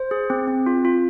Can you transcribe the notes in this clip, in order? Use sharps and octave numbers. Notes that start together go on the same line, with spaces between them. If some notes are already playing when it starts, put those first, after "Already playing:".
Already playing: C5
G#4
C4
C4
F4
F4